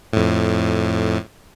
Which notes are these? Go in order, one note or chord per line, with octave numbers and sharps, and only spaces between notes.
F2 A2